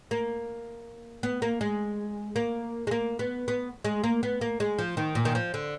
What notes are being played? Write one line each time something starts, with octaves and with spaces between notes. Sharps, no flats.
A#3
B3
A#3
G#3
A#3
G#3
A#3
B3
B3
G#3
A#3
B3
A#3
G#3
F3
D#3
A#2
D#3
F3
D3